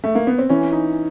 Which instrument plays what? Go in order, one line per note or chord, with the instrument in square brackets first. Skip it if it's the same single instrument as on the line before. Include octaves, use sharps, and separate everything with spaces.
[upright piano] A3
A#3
B3
C4
[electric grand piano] E3 [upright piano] C#4
[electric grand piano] D#4